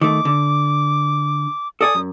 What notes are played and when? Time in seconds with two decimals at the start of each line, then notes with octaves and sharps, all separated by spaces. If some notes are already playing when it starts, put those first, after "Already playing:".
0.01 D#3 A3 D6
0.25 D3
1.81 A4 D5 G#5 D#6
1.95 F#2